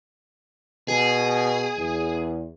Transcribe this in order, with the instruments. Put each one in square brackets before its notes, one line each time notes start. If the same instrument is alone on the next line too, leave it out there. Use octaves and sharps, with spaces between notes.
[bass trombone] B2 [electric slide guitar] G#4
[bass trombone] E2